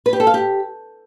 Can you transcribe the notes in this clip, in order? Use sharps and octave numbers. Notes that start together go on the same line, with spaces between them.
B4
G4
A4
F5
G4